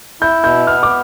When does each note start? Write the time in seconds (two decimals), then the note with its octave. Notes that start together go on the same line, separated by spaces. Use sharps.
0.21 E4 G6
0.44 B2 G6
0.67 B3 F6
0.83 D6